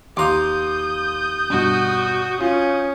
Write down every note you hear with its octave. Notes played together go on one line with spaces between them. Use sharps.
D#2 F5 A#5 C6 D6 D#6 G6
G2 B2 F#4
C#4 F4